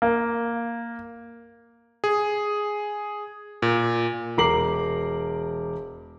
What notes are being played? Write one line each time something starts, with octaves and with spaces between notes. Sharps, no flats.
A#3
G#4
A#2
E1 A#4 A#5 D6 C7 F#7